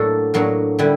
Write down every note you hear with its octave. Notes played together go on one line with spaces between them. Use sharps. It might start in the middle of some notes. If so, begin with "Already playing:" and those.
Already playing: A2 F#3 A#3 D4 A4
A2 F#3 A#3 D4
D3 G3 E4